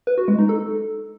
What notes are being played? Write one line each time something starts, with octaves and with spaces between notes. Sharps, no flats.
B4
F#4
G#3
D#4
A4